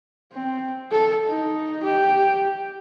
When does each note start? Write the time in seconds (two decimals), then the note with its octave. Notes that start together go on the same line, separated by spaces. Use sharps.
0.33 C4
0.92 A4
1.27 D#4
1.83 G4